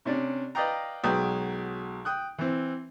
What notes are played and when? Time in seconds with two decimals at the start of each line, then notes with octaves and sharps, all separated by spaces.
0.05 C3 C#4 D4
0.55 B4 D5 D#5 F5 G5 A#5
1.04 B1 F#3 G#3 B4 G5 D#6
2.05 G5 D#6 F#6
2.38 E3 C4